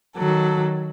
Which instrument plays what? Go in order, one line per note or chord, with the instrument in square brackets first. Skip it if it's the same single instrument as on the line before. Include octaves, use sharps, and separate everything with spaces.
[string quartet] D#3 F#3 A4